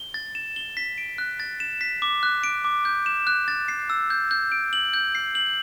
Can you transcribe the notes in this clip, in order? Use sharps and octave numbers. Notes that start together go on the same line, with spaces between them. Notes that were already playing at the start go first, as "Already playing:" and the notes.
Already playing: G7
A6
E7
G7
B6
D7
F#6
A6
E7
B6
D6
F#6
D7
D6
G6
E7
F#6
A6
C7
E6
G6
G6
D7
F#7
G6
C7
F#7